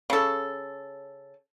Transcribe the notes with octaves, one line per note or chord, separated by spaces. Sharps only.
C#3 A4